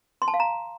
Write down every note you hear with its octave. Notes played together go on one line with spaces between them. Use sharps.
C6
A5
F5
A#5